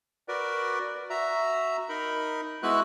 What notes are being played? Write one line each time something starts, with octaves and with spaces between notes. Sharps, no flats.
F#4 A#4 B4 D5
F#4 E5 A#5
D#4 A#4 B5
G#3 B3 E4 F#4 B4 F#6